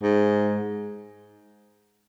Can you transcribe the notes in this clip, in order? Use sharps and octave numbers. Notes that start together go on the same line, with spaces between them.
G#2